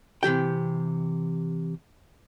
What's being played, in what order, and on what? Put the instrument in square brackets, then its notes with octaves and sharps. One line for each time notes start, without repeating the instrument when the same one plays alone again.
[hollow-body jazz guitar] C3 E3 G4 G5